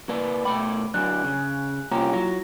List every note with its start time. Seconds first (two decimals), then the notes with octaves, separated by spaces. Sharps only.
0.09 A#3 B4 D5
0.45 B2 A3 G5 B5 D6
0.94 D3 F#3 D4 G#5 F#6
1.24 C#3
1.91 C2 A#3 C#4 F4 G4 A#5
2.13 F#3 E4 A#6